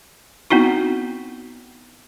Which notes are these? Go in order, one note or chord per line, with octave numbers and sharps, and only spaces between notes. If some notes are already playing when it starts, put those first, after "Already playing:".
B3 C4 D#4 E4 F#4